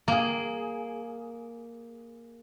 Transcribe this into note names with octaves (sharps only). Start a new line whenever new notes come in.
A#3 G#4